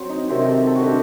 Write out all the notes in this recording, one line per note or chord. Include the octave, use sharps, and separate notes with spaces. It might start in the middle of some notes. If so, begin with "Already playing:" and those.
Already playing: F#3 C4
D#4
C3 D#3 F#3 C4 G4
A4
A4
F#4
D3 G3 G4